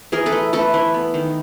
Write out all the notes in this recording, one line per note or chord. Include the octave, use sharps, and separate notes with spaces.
E3 G#4 A#4
A4 B4
A3
A3 A4 B4
E3
B3
D#3